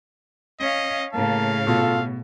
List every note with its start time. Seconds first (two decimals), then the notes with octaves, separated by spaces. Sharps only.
0.60 C#4 D#5 F5
1.13 A2 C#3 A#3 F5 A5
1.67 B2 F4 A4